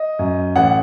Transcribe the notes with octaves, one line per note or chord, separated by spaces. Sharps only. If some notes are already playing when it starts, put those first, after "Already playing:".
Already playing: D#5
F#2
A1 F#5